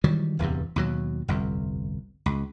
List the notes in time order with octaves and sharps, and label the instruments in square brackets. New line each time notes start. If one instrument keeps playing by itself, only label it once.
[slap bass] D#3 E3 F#3 G3
D1 E2 G2 C3
D#2 B2 F#3
G1 C2 F2
C#2